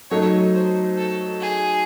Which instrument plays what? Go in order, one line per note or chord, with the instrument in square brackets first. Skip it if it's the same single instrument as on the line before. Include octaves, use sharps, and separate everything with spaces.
[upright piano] F#3 A3 D#4 [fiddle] C#5
[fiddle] C5
A4
G#4